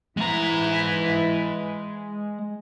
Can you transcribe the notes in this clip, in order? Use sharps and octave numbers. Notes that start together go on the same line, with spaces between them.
E3 G#3 E4 B4 A#5